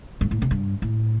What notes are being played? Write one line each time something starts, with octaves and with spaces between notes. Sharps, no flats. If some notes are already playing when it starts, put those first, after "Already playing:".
G2
A2
C3
G2
A2